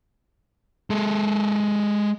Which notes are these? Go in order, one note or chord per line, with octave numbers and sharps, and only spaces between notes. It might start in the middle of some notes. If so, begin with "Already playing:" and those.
G#3 A4